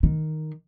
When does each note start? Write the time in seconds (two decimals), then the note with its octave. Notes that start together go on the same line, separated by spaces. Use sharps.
0.03 D#3